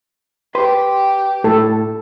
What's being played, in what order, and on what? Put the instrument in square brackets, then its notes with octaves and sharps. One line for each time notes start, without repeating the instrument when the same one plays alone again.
[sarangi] G4 [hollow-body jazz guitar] B4 C6
[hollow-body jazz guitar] A2 [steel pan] A4